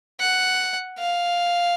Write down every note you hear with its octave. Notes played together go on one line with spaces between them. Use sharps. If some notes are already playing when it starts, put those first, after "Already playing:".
F#5
F5